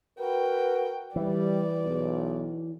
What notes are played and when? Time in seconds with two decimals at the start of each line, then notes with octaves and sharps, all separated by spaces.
0.20 F#4 A#4 B4 G5
1.16 E3 G3 D5
1.85 B1 E2